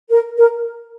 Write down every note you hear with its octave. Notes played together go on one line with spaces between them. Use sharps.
A#4
A#4